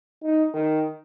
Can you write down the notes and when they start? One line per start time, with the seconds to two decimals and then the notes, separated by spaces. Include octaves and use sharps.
0.23 D#4
0.54 D#3